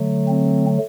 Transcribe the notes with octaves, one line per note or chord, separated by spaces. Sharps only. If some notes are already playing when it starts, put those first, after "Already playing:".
Already playing: D3 F#3 A3
C4